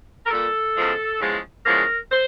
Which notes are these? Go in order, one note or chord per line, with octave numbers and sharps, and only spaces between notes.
A#4
A#2 G3 A#3 A4
E2 C#3 F3 G#3
E2 C#3 F3 G#3
E2 C#3 F3 G#3 A#4
C5